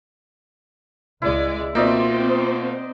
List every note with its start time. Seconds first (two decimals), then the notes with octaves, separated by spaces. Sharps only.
1.22 C#2 G#3 E4 D5
1.75 B2 A#3 C4 D#4 F4 C5 D5 E5